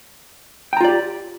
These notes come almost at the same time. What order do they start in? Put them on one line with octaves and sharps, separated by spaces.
G5 A#5 F4 D5 G4